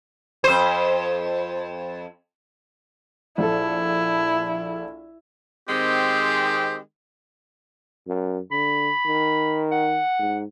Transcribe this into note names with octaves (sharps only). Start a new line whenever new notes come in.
F2 C5
A#1 E4 A4
D#3 G#3 C4 G4
F#2
D3 B5
D#3
F#5
G#2